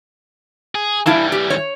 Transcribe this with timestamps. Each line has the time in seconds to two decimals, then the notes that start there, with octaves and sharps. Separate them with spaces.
0.75 G#4
1.06 E3 G3 E4 F5 A5
1.32 G4
1.50 C#5